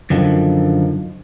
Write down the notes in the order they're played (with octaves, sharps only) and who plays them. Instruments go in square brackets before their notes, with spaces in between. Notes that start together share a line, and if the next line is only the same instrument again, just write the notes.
[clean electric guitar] F#2 D3 D#3 F3